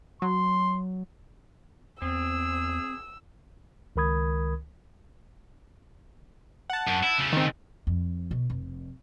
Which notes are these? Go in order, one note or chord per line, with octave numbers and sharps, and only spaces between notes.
F#3 C6
E2 C4 G#4 E6
C#2 D#3 A#4 B5 D#6 G#6
F#5 A5
F#2
E4
C#3 A3
D#3 C4
F2
B2
F1